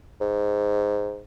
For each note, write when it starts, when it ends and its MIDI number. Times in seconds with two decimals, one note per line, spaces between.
0.21 1.21 44